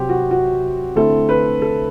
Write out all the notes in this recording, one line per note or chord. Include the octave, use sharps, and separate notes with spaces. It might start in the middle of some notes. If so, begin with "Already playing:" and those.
Already playing: C3 F#3 C4 G4
F#4
F#4
D3 A3 C4 E4 A4
B4
A4